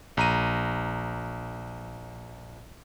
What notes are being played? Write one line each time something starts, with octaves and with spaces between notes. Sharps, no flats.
A#1 A#5 D#7